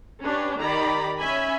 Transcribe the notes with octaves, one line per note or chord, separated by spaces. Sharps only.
C#4 D4 G4 B4 C#5
D#3 G4 D5 A#5 B5
C#4 E5 G#5 B5